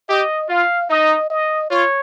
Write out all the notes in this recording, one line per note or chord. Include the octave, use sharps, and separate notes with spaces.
G4 D#5
F4 F5
D#4 D#5
D#5
F4 C#5